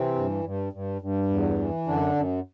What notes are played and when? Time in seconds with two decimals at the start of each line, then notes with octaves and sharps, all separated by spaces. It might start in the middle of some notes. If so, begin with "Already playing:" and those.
Already playing: C3 E3 C4
0.15 G2
0.44 G2
0.73 G2
1.02 G2
1.30 E2
1.58 E3
1.87 F#2 D3 D4
2.15 F#2